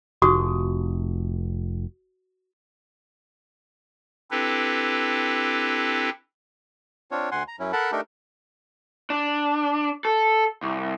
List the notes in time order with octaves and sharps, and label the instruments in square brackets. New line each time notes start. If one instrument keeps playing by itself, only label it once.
[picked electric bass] F1 [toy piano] F#4 C#6 D#6
[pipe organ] C4 D4 E4 G4 A4 B4
[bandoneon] C4 D4 F4 C#5
D2 F#5 G#5 C6
A#5
F#2 F#3 C#4 E4
A4 A#4 F#5 A5 B5
A3 D4 D#4 G4 A4 A#4
[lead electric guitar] D4
A4
C2